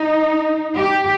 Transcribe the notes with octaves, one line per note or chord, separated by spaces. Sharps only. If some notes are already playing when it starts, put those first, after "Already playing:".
Already playing: D#4
G4